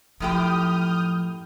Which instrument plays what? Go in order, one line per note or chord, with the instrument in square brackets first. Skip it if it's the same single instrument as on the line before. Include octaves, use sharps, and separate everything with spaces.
[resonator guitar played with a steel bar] F#2 A2 G4 [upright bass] F3 [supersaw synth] D#6 F6 G6